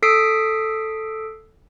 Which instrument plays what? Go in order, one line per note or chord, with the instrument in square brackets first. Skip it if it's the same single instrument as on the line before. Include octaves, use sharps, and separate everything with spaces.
[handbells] A4 D#6 E6 B6 C7 D7